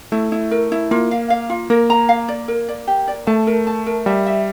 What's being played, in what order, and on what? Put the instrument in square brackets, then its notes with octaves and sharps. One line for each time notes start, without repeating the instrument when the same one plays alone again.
[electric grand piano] A3 [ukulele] E4
[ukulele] E4
A#4
E4
[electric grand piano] A#3 [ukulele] F4
[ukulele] F5
F5
F4
[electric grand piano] A#3 [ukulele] A#4
[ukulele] A#5
F5
D5
A#4
D5
G4
D5
[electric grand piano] A3 [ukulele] A5
[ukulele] A#4
A5
A#4
[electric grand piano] G3 [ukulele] E5
[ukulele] E5